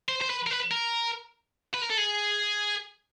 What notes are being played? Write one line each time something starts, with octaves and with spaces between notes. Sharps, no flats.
C5
C5
B4
A#4
B4
A#4
B4
A#4
A4
G#4